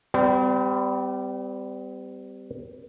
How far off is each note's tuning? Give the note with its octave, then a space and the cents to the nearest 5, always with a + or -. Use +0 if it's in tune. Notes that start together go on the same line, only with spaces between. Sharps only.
G3 +0 C4 -45 D5 +0